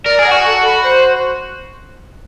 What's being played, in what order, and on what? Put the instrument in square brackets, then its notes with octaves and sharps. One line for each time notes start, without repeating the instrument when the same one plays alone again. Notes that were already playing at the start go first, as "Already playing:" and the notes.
[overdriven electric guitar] A#4 [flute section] D5
[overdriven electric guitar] G#4
[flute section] F#5
[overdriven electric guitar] F#4
[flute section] A4
B5
C5